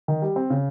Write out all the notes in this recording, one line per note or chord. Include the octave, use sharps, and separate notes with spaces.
D#3
G3
C4
C#3